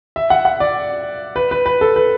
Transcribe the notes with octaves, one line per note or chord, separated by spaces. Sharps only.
E5
F#5
F#5
D5
B4
B4
B4
A4
B4